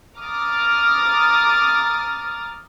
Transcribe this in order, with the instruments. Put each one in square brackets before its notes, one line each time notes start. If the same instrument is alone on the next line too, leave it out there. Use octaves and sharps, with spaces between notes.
[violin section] A#5 D6 D#6 F6 A6